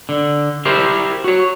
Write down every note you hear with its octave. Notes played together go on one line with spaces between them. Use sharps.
D3
E4 G4 A#4 C5
F#4 C#5